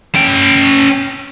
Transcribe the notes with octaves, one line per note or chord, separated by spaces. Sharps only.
C#4 G5